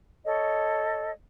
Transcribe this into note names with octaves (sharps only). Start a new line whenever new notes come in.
A4 C#5 D#5